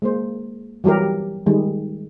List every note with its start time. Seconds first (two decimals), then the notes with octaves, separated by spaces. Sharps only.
0.02 G#3 A#3 C5
0.84 E3 F#3 G3 G4 A#4
1.46 D#3 G3 G#3